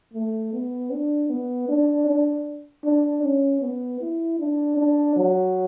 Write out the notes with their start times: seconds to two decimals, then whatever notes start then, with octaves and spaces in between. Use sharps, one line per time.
0.14 A3
0.53 B3
0.91 D4
1.29 B3
1.68 D4
2.07 D4
2.84 D4
3.23 C#4
3.62 B3
4.01 E4
4.39 D4
4.78 D4
5.16 F#3